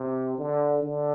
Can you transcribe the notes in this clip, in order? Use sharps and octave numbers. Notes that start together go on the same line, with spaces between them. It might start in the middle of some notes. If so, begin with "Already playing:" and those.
Already playing: C3
D3
D3